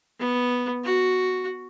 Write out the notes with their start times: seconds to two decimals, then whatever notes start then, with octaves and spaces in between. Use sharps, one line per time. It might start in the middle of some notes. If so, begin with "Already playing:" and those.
0.19 B3
0.84 F#4